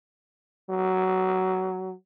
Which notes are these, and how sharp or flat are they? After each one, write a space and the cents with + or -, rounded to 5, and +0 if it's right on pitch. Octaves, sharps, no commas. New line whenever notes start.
F#3 +15